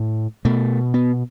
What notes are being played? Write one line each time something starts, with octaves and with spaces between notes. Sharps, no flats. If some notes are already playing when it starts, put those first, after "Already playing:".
Already playing: A2
B2 A3
B3